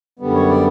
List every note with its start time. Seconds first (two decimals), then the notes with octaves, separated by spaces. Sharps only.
0.19 F#2 D3 G3 B3
0.34 C#5
0.49 D5